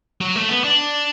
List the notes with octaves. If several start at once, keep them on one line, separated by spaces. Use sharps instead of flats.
F#3
A3
B3
D4